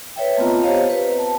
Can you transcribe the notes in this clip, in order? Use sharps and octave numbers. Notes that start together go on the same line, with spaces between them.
B4 C#5 E5 G5
A3 B3 C4 F4 D#5 A#5
G4 C5 C#5 D#5 F5
B4
A5